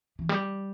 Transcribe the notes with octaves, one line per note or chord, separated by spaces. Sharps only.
E3
G3